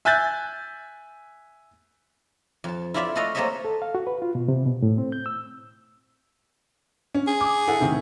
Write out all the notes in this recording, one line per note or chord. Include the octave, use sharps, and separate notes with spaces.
E5 G#5 F#6 G6 A6
F2 A5
E4 F4 A4 D5 E5 F5
A3 F#4 A4 D#5 F5
A#3 C4 A4 C#5 D#5 E5
A4
F5
F#4
B4
F4
B2
C3
B2
A2
C4
G6
E6
C#4
G#4
D6 D#6
E4 A4 F#5
A2 C3 D#3